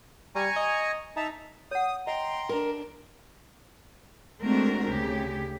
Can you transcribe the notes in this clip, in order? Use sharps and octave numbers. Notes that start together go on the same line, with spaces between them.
G3 G#5 A#5 C#6
D#5
D#4 E5 A5 A#5
C#5 F#5 D#6
D#5 G5 A#5 C6
D4 A#4
G#3 A3 C4 D4 F#4 A#4
D2 C#3 G4